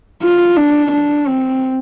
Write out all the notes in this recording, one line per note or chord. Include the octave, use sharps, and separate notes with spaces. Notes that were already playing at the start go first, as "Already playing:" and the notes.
F4
D4
D4
C4